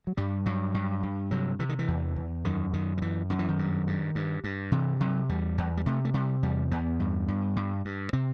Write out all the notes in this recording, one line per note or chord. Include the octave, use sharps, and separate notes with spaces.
F#3
G2 G3
G2 F#3
G2
G2
C3 F#3
C3 E3
D#3
E3
E2
E2
F#2 D#3
F#2 D#3
D#3
F#2 E3
F#2 D#3
E3
D#3
G2
G2
G2
G2
C3 E3
C3 F#3
E2 G3
E2
G3
C3 A3
A3
C3 G3
E2 G3
E2 B3
G2
G2
G2
G2
C3 C4